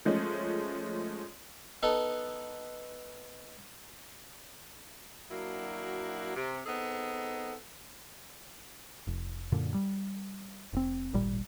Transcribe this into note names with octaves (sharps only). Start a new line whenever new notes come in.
F3 G#3 A3 C#4
B3 D#4 A4
F#3 A#3 D4 E4 F#4
C3
B3 C4 D#4 G#4 A4
F1
F#2 A#2 D3
G3
F1 C4
D1 G#1 A#2 G3